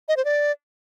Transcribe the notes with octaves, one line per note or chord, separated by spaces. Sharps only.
D#5
C5
D5